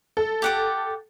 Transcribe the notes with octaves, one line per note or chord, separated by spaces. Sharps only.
A4
G4 F#5 D6